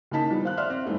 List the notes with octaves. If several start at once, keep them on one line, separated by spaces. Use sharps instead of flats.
C#3 A#3 D#4 A5 B6
D#3 F3 G3 B3
C5 F5 F#6
D5 E5 F#5 C6 F6
C4
G2 D#3 E3 A3 B3